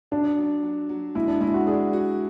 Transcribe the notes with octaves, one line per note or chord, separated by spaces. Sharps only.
F#3 D4
F#3
F#3
F#3
G#3 E4
D4
G#3 E4
F#4
D4 G#4
F#4